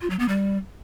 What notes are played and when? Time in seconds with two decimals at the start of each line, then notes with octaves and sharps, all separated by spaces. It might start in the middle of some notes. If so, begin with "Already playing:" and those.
0.01 F4
0.10 F#3
0.19 B3
0.29 G3